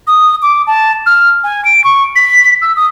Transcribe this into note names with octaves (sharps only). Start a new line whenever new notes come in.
D#6
D6
A5
F6
G#5
D7
C#6
B6
E6
D#6